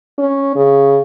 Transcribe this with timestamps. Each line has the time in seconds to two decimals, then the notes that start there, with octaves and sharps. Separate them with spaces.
0.18 C#4
0.55 C#3